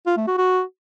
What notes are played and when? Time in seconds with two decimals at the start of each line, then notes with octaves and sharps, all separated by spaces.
0.06 F4
0.17 A3
0.27 F#4
0.38 F#4